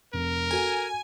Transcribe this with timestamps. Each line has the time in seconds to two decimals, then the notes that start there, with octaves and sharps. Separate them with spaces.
0.13 F1 A#4
0.51 F#4 A4 G#5